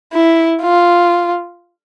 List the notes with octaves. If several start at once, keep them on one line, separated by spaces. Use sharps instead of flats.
E4
F4